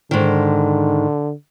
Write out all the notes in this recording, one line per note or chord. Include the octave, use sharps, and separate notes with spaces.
G#2 D3 D#3